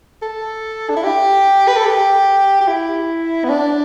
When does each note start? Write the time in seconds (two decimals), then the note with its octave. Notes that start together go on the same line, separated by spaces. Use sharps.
0.22 A4
0.90 D4
0.97 E4
1.04 G4
1.68 B4
1.76 A4
1.85 G4
2.61 G4
2.68 E4
3.44 B3
3.49 D4